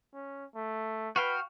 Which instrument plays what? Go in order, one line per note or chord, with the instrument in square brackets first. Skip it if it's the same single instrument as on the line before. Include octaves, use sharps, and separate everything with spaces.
[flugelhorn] C#4
A3
[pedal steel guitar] F#4 F5 G5 [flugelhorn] B4